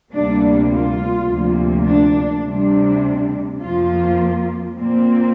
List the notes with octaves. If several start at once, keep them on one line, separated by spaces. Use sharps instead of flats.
D2 C3 G3 A#3 D4
F4
D2 C3 F3 A#3
D4
D2 C3 G3 D4
F2 F3 A#3 F4
A#2 A#3 C4